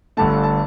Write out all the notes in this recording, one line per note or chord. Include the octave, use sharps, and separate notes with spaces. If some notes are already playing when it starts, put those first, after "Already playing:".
G1 G2 D3 A3 A5
A5